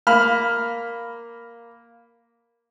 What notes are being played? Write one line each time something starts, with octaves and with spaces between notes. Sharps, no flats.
A#3 B5 F6